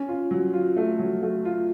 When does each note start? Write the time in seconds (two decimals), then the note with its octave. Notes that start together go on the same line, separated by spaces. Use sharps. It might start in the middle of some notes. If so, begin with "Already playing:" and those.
Already playing: C#4
0.08 F4
0.31 F#3
0.53 F4
0.76 A3
0.99 F#3
1.22 A3
1.45 F4